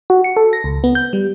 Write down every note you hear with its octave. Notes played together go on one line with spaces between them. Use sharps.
F#4
C#7
A4
A#6
C#2
B3
G6
G3